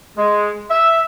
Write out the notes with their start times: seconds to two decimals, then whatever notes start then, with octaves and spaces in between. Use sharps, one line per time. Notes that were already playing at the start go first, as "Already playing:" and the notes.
0.17 G#3
0.70 E5